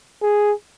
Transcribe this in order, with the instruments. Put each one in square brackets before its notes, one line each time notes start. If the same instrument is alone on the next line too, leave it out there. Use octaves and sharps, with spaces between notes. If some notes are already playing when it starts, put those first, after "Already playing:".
[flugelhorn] G#4